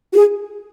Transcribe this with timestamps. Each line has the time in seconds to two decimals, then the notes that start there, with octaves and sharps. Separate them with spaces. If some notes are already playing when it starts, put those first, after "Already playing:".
0.11 F#4
0.16 G#4